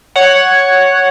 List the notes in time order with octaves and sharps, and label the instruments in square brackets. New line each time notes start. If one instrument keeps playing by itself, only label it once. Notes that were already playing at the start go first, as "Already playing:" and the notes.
[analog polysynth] C#5 F#5